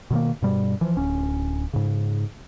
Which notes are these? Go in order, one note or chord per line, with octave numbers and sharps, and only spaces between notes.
B2 D#3 A#3
G2 B2 G3
E3 F3
D1 C#4
G#2 C#3